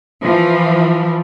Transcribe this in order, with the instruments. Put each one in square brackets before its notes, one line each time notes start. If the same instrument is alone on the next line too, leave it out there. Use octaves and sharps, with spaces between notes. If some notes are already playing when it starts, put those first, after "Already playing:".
[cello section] E3 F3